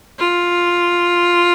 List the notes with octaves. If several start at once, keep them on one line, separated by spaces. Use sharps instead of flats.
F4